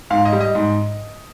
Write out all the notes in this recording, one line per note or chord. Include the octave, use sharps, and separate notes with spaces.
G#2 F5
D#5
G3
D#5
G#2